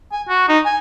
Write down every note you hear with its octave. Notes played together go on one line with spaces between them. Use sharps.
G#5
F#4
D#4
G#5